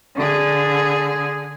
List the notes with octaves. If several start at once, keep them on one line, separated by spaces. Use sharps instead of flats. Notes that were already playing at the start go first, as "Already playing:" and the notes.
D3 G#4